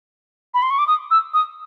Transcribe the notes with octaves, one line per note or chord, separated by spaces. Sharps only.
B5
C6
C#6
D6
D#6
E6
D#6